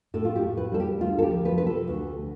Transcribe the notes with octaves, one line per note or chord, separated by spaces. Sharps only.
A2 A4
F4
G4
A2
B4
G3 A4
G4
D2 F4
A4
G4
F3
B4
C3 B4
A4
D2